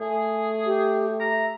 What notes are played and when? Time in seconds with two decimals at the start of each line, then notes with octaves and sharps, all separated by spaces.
0.01 A3 G#4 G#5
0.66 G4
1.20 E5 A#5